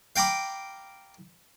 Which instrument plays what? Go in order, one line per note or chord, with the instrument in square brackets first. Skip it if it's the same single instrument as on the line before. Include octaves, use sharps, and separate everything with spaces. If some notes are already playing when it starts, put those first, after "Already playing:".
[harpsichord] F5 G5 A#5 B5 D6